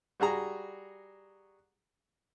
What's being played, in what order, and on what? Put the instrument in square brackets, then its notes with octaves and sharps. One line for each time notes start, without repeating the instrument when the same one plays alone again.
[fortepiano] G3 F#4 G#4 A#5